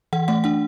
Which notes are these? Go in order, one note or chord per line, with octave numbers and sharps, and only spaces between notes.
E3 F#5
A3 F#5
D4 F#5